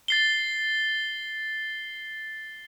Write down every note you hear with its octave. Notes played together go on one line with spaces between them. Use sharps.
A6 C7 G7